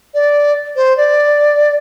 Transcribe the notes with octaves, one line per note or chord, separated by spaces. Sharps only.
D5
C5
D5